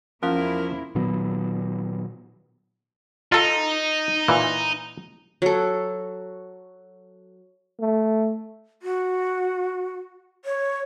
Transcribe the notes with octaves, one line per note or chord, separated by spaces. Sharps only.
E2 F3 A#3 C#4 E4 A#4 F5
A#2 D#3 F#3 B3
D#4 F4 A4
A#2 E3
F#3 A4
A3
F#4
C#5